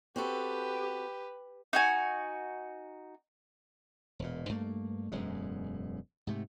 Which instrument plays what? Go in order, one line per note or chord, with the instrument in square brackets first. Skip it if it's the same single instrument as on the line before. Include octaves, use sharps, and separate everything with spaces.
[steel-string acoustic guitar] C4 F#4 A4 [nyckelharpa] G4 B4
[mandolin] D#4 F#4 G#5
[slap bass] E1 A#2
G2 A3 A#3
E1 F#2 A2 G#3
G#2 C3 A3